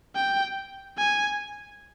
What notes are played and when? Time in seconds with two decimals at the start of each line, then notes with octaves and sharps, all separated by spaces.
0.16 G5
0.98 G#5